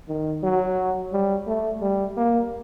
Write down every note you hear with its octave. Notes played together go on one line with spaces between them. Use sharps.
D#3
F#3
G3
A3
G3
A#3